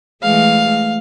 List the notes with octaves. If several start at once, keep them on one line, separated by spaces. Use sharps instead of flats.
E3 G#3 A3 F5